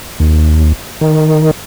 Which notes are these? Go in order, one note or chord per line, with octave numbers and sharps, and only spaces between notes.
D#2
D#3